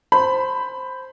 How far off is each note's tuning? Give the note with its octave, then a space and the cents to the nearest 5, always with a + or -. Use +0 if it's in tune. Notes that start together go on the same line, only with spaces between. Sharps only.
C5 +0 B5 +10